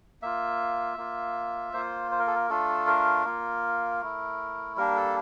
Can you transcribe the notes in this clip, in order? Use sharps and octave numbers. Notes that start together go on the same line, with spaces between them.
A#3 F4 E5
A#3 F4
A#3 F4 C5
C5
A#4
A4
A#4
A3 D4 F4 A4
A#4
A#3 F4
A3 E4
G3 A#3 D4 A#4
A4